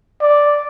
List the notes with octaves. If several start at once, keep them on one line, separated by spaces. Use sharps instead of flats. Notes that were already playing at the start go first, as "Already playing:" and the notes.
D5